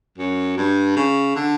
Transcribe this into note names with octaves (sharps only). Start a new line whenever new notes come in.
F#2
G2
C#3
D3